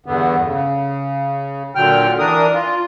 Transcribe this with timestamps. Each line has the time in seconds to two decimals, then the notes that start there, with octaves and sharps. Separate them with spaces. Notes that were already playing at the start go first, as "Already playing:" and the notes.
0.06 E2 G2 D3 B3
0.46 C#3
1.75 A#2 D3 F#3 G5 F6
2.19 E3 D4 A#4 D#6
2.53 F4